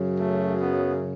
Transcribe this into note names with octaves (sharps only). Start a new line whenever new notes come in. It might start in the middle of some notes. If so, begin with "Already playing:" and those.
Already playing: F#2 C#3 F#3
A3
B3